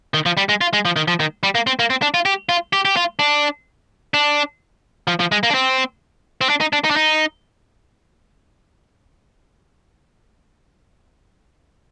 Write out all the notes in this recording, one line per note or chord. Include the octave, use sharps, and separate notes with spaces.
D#3
F3
G3
G#3
F4
G#3
F3
D#3
F3
D#3
G3
A#3
C4
A#3
C4
D4
F4
G4
F4
G4
G4
F4
D4
D4
F3
F3
G#3
A#3
D4
C4
C4
D4
D#4
D4
D#4
D4
D#4